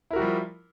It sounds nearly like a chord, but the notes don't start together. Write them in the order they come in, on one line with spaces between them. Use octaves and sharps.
E4 A#4 F#4 G3 F3